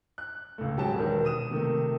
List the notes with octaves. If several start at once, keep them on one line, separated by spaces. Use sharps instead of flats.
F#6
C#2 A3
G#2 F#3 G4 G#4 A5 E7
E1 D#3
D#6 D#7 E7
C3 D#3 A3